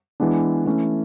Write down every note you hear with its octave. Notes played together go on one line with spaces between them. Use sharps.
E3 G#3 B3 D4
E3 A3 C#4